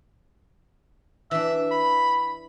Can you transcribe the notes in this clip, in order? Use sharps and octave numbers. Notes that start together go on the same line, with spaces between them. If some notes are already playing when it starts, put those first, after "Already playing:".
E3 D4 E5
B5